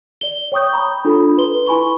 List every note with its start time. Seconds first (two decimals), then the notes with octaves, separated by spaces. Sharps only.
0.21 D5 G7
0.52 C#5 G5 C#6 D#6 G6
0.73 A#5 B5 D#6
1.05 D4 F4 A4 B5
1.38 B4 C6 G7
1.66 E4 G#5 B5 C#6 G7